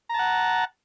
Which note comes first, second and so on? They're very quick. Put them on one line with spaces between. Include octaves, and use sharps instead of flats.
A#5 A5 F#5